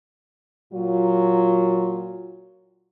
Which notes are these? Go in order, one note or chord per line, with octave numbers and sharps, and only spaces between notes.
A#2 F#3 F4